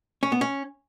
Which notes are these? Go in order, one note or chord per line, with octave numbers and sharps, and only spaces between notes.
C#4
B3
C#4